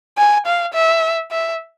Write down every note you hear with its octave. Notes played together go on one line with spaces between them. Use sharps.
G#5
F5
E5
E5